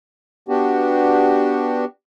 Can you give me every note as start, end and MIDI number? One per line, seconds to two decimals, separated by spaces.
0.49 1.85 59
0.49 1.85 62
0.49 1.85 66
0.49 1.85 67